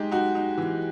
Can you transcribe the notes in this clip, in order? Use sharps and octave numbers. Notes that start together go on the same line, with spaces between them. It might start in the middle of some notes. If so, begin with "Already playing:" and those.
Already playing: G#3 D#4 G4
D#4 F#4
D#4
E3